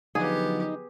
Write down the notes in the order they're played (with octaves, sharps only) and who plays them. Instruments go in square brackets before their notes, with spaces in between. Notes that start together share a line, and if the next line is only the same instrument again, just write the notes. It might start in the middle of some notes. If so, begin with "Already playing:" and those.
[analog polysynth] D3 F3 F#3 [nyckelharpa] B3 G4 [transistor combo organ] D#4 [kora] G#4